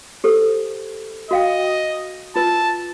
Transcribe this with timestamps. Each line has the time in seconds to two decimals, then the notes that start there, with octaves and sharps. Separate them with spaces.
0.24 G4 A4 C5
1.31 F#4 D#5 F5 G5
2.36 F4 B4 A5 E6